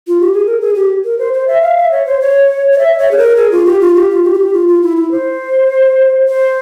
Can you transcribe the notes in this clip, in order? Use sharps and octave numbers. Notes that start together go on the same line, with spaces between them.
F4
G4
G#4
A#4
G#4
G4
A#4
C5
C5
E5
F5
E5
C#5
C5
C#5
C#5
E5
C#5
G#4
A#4
G#4
F4
G4
F4
G4
F4
G4
F4
G4
F4
F4
E4
E4
C5
C5